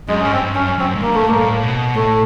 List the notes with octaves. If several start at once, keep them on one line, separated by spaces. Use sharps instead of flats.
F#2 G#3
G#2 C#4
G2 C4
F#2 C#4
C#4
F#2 C4
G#2
G2 A#3
A3
A2 A#3
B2
A2 A3